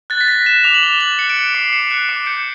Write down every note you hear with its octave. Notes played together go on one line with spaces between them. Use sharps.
F#6 A6
B6
F#6 A#6
F#6 E7
D6 F7
F#7
D6 G7
F#6 F#7
F#6 C#7
D7
F#6 C#7
D6 C7
D6 C#7
F#6 C#7
D6 D7
G6 C#7